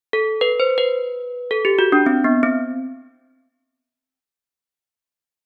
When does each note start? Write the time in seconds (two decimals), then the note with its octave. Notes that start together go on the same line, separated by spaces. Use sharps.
0.13 A4
0.41 B4
0.60 C5
0.78 B4
1.51 A4
1.65 G4
1.79 F#4
1.92 D4
2.06 C4
2.24 B3
2.43 C4